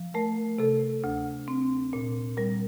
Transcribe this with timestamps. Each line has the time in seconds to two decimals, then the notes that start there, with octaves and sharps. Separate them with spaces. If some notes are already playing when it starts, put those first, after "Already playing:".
Already playing: F3
0.14 A3 A#4
0.59 C3 A4
1.04 D2
1.48 C4
1.93 A#2
2.37 G3 A#4